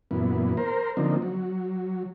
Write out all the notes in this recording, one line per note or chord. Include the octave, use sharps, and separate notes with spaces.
F#2 A#2 E3 B3
A#4 C5
D3 F3 A#3 C4 D#4
F#3